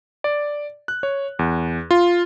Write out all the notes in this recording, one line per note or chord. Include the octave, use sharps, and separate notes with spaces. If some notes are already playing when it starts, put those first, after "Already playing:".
D5
F#6
C#5
E2
F4